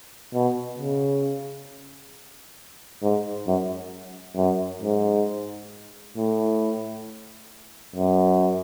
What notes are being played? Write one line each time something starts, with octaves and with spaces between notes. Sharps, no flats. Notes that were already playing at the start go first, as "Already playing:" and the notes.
B2
C#3
G#2
F#2
F#2
G#2
A2
F#2